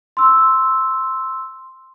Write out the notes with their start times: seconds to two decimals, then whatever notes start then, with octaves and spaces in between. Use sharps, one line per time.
0.17 C6 E6